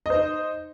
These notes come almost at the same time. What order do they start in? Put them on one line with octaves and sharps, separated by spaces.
D#5 C5 D#4